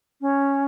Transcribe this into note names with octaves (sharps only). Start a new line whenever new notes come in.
C#4